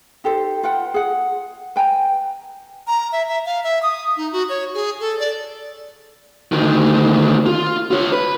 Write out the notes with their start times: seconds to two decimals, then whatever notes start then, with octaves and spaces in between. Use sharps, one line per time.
0.24 D#4 G4 A4 C5
0.63 F4 B4 F#5 G5
0.94 G#4 F#5
1.76 B4 G5 G#5 A#5
2.87 A#5
3.12 E5
3.28 E5
3.46 F5
3.63 E5
3.83 D#6
4.17 D#4
4.32 F#4
4.49 C#5
4.74 G#4
5.00 A4
5.19 D5
6.52 D2 D#3
7.46 F4
7.91 F4 C#5
8.12 B4